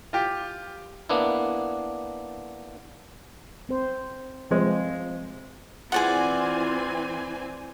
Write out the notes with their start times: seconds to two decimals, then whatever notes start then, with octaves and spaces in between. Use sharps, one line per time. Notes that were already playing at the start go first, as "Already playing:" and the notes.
0.13 F4 G4 G5
1.09 A#3 B3 D4 E4
3.69 C4 C5
4.51 C3 F3 G#3 C4
5.92 E3 C4 F4 G#4 D5 F#5 G#5